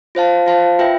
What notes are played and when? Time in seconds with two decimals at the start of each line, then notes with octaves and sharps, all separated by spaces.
0.15 F4 C5 F5 A5
0.46 F4 C5 F5 A5
0.79 F4 B4 E5 G5